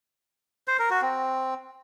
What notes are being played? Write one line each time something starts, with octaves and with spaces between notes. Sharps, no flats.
C5
A#4
F#4
C4